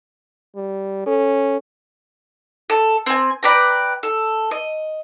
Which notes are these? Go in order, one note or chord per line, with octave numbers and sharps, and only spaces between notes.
G3
C#4 A4
A4
C4 G#5
B4 D5 G5 A#5
A4
D#5